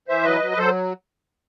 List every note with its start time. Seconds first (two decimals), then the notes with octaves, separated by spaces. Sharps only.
0.08 E3 C5 E5
0.25 F#3 B4 D#5
0.41 F#3
0.52 B4
0.58 F#3 A4 C5